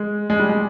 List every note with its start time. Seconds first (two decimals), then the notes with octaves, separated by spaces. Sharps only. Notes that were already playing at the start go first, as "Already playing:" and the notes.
Already playing: G#3
0.30 G#3
0.39 G3
0.49 G#3